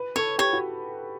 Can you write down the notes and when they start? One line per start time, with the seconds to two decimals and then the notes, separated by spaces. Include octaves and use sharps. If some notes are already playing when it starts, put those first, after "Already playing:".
Already playing: B4
0.16 A4 C#5
0.38 G4 C#5
0.53 F#4